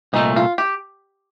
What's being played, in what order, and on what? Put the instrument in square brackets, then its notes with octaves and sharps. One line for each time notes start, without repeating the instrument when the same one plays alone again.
[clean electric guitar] C2 A#2 A3 [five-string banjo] D#4
[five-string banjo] F4
G4